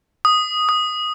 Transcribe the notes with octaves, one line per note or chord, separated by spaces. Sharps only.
D#6
D#6